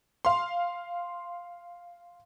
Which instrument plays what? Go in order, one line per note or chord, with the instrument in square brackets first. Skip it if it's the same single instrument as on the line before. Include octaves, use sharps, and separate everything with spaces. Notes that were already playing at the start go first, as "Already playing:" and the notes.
[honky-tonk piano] F5 C6